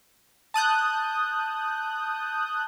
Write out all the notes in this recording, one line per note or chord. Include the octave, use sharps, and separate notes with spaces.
A5 D#6 F#6 G6